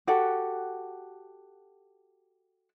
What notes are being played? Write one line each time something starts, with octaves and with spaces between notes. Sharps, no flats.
F#4 G4 A4 F#5